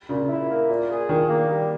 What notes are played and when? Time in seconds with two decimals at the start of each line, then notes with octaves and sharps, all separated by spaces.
0.09 A#2 C#3
0.29 E4
0.50 A#3
0.69 A#2
0.89 G#4
1.09 A#2 D#3
1.29 A#3
1.50 G3